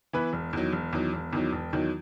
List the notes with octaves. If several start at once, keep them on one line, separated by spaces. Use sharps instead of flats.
E3 B3 E4 B4
E1
E2 D#3 F#3
E1
E2 D#3 F#3
E1
E2 D#3 F#3
E1
E2 D#3 F#3